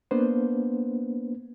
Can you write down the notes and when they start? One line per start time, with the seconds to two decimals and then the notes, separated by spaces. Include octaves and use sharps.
0.11 A#3 B3 D4 B4 C5